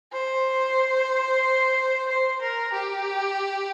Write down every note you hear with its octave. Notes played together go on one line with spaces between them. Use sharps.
C5
C5
A#4
G4